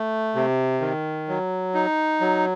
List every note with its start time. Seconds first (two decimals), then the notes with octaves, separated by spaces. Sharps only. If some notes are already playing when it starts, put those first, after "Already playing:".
Already playing: A3
0.35 C3
0.81 D#3
1.28 F#3
1.74 D#4
2.21 F#3